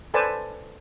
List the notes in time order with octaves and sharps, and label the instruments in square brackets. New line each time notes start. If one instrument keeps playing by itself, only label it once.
[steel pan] A4 B4 C5 D5 G#5 A5